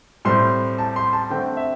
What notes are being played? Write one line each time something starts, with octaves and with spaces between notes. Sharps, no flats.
A2 G3 C4 C6
A5
C6
A5
D3 A3 C4 G5
E5